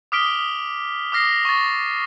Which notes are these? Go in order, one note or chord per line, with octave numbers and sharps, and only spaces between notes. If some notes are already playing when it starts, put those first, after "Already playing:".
D6 D#6 F6 B6 D7 G7
D6 D#6 F6 A#6 C7
C#6 A6